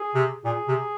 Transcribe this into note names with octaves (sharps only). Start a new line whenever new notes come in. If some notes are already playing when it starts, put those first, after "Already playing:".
Already playing: G#4
C3
A#2 G#4
C3